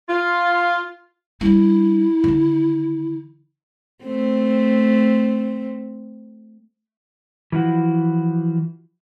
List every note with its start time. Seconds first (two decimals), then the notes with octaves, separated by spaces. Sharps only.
0.09 F4
1.41 G3 D4 E4
2.24 D3 D#3
4.04 A3 C4
7.52 E3 F3 E4 F#4